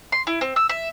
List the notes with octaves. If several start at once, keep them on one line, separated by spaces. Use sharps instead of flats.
C6
E4
C4
E6
E5